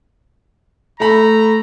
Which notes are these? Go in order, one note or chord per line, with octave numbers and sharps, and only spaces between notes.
A3 A#5 B5